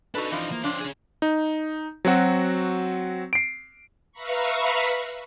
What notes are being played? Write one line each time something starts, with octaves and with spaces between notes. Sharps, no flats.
D4 D#4 F#4 A4 B4
E3 F3
A#3
F3 C#4 D4 C5
C#4 G#4
D#4
F#3 C4 F#4
C7 D7
B4 E5 F5 A#5 B5 C#6